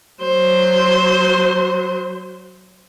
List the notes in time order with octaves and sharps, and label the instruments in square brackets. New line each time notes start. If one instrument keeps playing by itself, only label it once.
[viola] F#3 C5